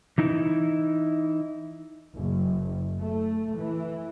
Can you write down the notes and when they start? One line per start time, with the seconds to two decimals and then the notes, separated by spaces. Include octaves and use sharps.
0.18 E3 D#4 E4
2.16 F#1
3.01 A3
3.56 E3